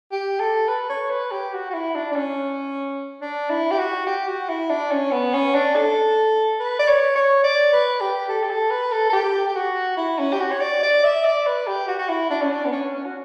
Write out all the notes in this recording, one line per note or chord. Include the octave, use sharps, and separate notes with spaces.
G4
A4
B4
C#5
B4
G4
F#4
F#4
E4
D4
D4
C#4
D4
E4
G4
F#4
G4
F#4
E4
D4
C#4
B3
C#4
D4
A4
B4
D5
C#5
C#5
D5
B4
G4
A4
G4
A4
B4
A4
A4
G4
G4
F#4
E4
C#4
G4
F#4
C#5
D5
D5
E5
D5
B4
G4
F#4
F#4
E4
D4
C#4
D4
B3
C#4
C#4
F#4